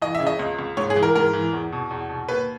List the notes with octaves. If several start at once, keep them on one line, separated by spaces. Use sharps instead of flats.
E3 D#5
E5
C#3
D#5
C#2
C#2
G#2 C#5
G#4
E3
A#4
G#2 A#4
E3
E2
B2
E2
B2
D#2 B4